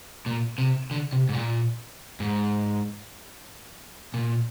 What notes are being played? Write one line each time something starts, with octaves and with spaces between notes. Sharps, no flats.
A#2
C3
D3
C3
G#2
A#2
G#2
A#2